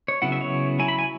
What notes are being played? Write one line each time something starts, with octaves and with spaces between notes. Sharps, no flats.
C#5
C#3 F#3 B3 E4 F#5
E5
C#5
F#3 E4 G#5
B5
G#5